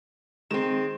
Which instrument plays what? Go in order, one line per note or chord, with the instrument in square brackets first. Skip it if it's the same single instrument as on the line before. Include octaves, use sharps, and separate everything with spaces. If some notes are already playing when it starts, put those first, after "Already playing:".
[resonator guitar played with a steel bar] D#3 C4 [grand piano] G#3 E7